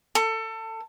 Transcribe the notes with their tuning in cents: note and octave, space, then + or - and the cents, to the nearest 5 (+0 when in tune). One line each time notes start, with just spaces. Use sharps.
A4 +25